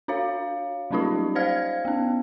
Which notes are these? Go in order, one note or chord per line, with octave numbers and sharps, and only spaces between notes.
D4 F#4 C#5 F5
F#3 G3 C#4 D#4 F4 G4
C5 D5 D#5 F5 F6 G#6
B3 C#4